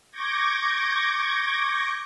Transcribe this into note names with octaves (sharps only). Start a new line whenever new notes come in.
C#6 D6 G6 G#6 A#6